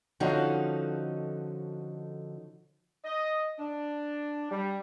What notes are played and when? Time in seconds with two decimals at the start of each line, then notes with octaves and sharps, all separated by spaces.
0.20 D3 F3 C#4 D#4 F#4 A4
3.05 D#5
3.59 D4
4.51 G3